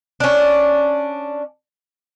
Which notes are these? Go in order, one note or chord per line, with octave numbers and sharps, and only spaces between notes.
C#4 D4